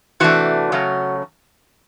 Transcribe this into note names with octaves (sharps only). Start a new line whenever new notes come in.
C3 E3 A3 D4 F#4
C#3 F#3 A3 C#4